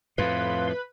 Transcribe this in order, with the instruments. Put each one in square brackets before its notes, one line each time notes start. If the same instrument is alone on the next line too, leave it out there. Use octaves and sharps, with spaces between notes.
[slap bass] F2 A2 [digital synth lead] B4 [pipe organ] F5 C6